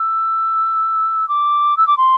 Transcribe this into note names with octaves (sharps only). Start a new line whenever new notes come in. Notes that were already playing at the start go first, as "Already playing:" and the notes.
Already playing: E6
D6
E6
D6
C6